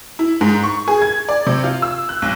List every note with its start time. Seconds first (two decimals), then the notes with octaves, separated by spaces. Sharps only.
0.19 E4
0.41 G#2
0.63 C#6
0.88 G#4
1.02 G#6
1.29 D5
1.46 C3
1.64 F4
1.82 E6
2.09 F#6
2.22 B1